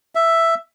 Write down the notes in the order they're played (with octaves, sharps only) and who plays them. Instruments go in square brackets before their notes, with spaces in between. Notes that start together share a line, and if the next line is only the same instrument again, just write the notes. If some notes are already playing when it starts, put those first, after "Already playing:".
[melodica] E5